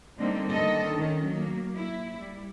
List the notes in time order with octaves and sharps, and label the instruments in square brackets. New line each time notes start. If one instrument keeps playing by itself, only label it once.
[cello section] D3 G3 A#3 C4 D#4
D3 D#3 A4 D#5
D#3 C#4
F#3 A#3
E4
G3